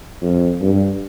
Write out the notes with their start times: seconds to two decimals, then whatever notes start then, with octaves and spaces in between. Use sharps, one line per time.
0.22 F2
0.61 G2